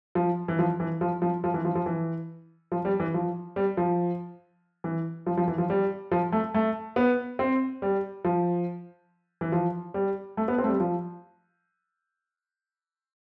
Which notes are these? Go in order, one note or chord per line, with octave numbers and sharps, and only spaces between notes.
F3
E3
F3
E3
F3
F3
F3
E3
F3
F3
E3
F3
G3
E3
F3
G3
F3
E3
F3
F3
E3
F3
G3
F3
A3
A3
B3
C4
G3
F3
E3
F3
G3
A3
B3
C4
A3
G3
F3